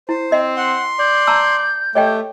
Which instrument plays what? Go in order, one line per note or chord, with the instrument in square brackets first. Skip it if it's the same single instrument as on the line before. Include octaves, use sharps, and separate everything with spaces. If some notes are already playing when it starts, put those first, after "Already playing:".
[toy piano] E4 [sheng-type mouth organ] C5
[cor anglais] C4 [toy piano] D#5
[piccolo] F#5 [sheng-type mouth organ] C6
[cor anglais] D5 [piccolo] G6
[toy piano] A5 A#5 E6
[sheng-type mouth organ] A3 [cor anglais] G4 [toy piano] C#5 D#5 G5